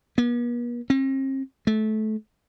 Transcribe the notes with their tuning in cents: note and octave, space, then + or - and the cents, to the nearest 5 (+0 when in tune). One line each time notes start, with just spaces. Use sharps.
B3 -45
C4 +45
A3 -25